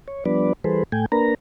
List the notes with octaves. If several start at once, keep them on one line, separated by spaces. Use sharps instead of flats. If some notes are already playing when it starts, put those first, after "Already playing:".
C#5
F3 G3 B3 D4 B4 D5
E3 G3 G#4 A4 B4 C5
A2 A3 G5 G#5
A#3 D4 A#4 B4 A#5